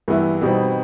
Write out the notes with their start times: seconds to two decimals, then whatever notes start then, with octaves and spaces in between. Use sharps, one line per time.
0.08 G2 E3 B3 E4
0.41 B2 G3 C4 D#4